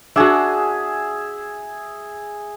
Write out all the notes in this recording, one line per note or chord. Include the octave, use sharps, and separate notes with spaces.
D4 F#4 G#4 E5